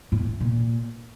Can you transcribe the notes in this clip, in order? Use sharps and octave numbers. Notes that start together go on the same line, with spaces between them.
A2
A#2